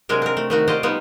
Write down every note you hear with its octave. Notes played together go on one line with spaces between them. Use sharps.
C3 F#3 G#3 D4 A#4
C4 A#4
A3
D#3 A3 F#4
F4 G4 C5 D5 D#5
G3 B3 D#4 F4